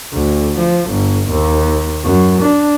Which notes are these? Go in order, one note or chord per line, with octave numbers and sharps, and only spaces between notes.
D2
F3
G1
D#2
F#2
D4